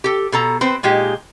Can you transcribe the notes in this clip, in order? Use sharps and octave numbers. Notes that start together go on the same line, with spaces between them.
G4 A4
B2 A4 A#5
C4 B4 C5
A#2 G#3 D#4 G4